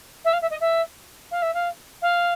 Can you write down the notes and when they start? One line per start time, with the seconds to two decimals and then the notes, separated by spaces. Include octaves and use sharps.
0.25 E5
0.33 F5
0.42 E5
0.50 D#5
0.60 E5
1.31 F5
1.42 E5
1.54 F5
2.02 F5